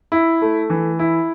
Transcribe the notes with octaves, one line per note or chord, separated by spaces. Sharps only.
E4
A3
E3
E4